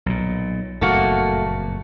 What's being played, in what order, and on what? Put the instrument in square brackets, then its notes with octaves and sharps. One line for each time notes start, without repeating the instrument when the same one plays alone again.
[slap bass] B1 A#2
[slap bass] F#1 F2 A#2 [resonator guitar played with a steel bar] A3 A#3 F#4